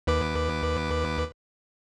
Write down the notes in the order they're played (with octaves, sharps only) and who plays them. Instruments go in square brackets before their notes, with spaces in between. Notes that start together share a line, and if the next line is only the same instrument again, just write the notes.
[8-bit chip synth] D#2 B4 D6